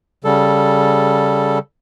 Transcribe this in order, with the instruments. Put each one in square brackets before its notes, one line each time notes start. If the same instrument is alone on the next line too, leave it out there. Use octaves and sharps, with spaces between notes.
[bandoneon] C#3 G3 A4